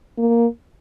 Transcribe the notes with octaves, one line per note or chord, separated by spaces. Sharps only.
A#3